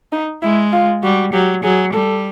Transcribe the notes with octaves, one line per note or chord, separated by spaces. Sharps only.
D#4
G#3 E4
F4
G3 F#4
F#3 G4
F#3 G#4
G3 A4